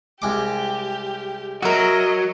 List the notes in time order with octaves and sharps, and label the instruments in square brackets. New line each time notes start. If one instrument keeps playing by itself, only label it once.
[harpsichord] C2 G#3 D6 [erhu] G4
[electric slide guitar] F#3 F#4 [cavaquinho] A#4 E5 [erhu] D#5